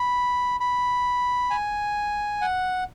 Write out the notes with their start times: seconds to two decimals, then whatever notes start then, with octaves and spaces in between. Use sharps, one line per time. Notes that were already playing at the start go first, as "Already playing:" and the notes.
Already playing: B5
0.60 B5
1.50 G#5
2.41 F#5